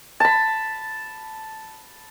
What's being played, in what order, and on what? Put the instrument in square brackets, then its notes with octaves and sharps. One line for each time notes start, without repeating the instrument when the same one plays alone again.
[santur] A5 B5